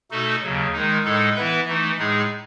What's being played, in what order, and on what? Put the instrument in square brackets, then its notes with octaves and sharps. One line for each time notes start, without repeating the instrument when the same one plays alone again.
[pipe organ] B2 A3 D#4 F#4 A4
D#2 C#3 F#3
D#3 G#3 D#4
A2 G#3 D#4 A4
E3 B3 E4 B4 E5
E3 A3 D#4
A2 G#3 D#4 G#4